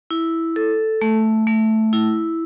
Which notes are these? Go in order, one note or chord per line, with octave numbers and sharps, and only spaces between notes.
E4
A4
A3
A3
E4